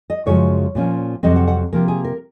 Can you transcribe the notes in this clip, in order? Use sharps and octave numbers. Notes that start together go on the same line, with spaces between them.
D#5
F#2 C#3 F3 G#3 C#5
A#2 F3 A#3 C#4
F2 C3 F#3 C4 D#5
F#5
F#5
C3 F3 A#3 A#4
G#4
A#4